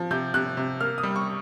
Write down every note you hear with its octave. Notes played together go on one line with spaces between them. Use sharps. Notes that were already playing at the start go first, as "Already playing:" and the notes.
Already playing: F3
C3 G6
C3 F#6
C3
A#3 F6
D#6
G3
C#6